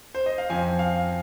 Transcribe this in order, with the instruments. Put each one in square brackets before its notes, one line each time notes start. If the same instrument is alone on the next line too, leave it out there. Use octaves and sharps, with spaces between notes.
[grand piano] C5
D#5
F5
F2 F3 G#5
F5